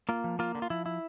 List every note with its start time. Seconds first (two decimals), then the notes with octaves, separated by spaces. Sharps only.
0.09 A#3 F4
0.24 F3
0.39 A#3 F4
0.55 D3
0.62 F4
0.70 F3 E4
0.86 E4